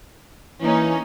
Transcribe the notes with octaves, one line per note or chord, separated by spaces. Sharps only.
E3 A#3 C#4 D#4